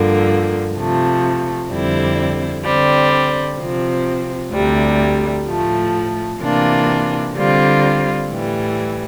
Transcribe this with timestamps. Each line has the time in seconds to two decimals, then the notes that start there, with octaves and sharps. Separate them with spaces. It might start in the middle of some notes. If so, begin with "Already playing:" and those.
Already playing: G2 D3 F3 A#3
0.76 C3 F3 A3
1.70 F2 D3 G3 C4 E4
2.65 D3 G3 C4
3.59 C3 F3 C4
4.53 D2 C3 G3
5.47 A2 F3 A3
6.41 C3 E3 A#3 D4 F4
7.34 D3 G3 C4 F4
8.29 A2 E3 G3